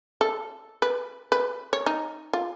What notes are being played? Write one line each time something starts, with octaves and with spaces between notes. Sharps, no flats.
A4
B4
B4
C#5
D#4
F4